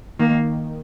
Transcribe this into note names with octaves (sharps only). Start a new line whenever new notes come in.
D#3 A#3